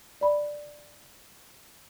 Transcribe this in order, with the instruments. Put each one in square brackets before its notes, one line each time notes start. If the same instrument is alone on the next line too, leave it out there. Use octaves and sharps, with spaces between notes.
[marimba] D5 B5